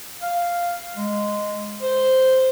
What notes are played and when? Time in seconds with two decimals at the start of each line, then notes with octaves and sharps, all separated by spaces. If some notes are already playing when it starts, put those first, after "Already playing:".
0.22 F5
0.97 G#3
1.83 C5